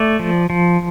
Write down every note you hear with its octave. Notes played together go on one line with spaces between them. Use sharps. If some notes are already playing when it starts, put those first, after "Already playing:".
Already playing: A3 D5
F3
F3